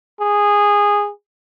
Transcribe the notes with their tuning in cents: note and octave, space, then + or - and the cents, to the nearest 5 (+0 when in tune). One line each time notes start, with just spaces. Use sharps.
G#4 -15